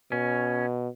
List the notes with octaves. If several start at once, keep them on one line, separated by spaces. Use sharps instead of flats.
B2 C#4